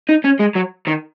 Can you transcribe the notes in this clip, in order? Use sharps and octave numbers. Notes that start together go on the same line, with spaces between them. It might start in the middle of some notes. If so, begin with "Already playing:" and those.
D#4
C#4
G#3
F#3
D#3